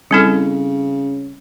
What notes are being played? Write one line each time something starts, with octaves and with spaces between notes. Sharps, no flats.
C#3 G3 C4 E4 A4